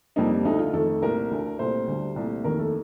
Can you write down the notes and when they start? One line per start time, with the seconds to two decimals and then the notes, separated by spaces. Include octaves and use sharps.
0.16 F2 C3 G3 A#3 D#4
0.45 D2 D3 A3 D#4
0.59 F4
0.73 F2 D#3 A3 A4
1.02 C2 A#2 A3 A#4
1.31 D2 D3 A3
1.58 C2 A#2 A3 C5
1.87 D2 D3 G3
2.16 C2 A#2 A3
2.44 F1 D#2 D#3 A3 A#4
2.59 A4